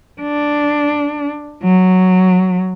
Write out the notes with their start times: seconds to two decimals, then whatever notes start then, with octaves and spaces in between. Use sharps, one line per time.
0.22 D4
1.63 F#3